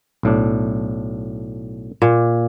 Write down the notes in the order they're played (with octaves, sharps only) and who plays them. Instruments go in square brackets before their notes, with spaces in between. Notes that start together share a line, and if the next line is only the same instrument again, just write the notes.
[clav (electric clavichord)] B1 A2 D4
[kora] A#2